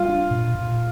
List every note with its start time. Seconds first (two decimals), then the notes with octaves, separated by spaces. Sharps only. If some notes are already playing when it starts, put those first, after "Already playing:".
Already playing: G3 F4
0.09 D4
0.31 A#2
0.55 A#2